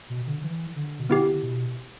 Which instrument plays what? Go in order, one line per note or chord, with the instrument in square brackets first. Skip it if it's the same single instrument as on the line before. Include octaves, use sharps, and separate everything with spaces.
[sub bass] B2
D3
E3
D3
B2
[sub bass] D3 [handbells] B3 E4 G4
[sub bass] B2